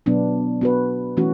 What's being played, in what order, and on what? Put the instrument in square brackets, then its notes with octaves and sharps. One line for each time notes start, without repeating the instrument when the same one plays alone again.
[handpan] B2 F#3 B3 D4
B3 F#4 B4
E3 A3 C#4 F#4